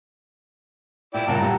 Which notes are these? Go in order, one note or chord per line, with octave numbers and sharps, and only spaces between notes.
A#2 E4 D5 G5
G2 A#2 C#3 F#5 A5 A#5
G4